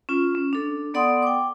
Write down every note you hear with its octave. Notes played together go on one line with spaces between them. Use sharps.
C#4 F4
C#4
D4 A4
B3 A4 D5 F#5 C6 D#6
G5 D6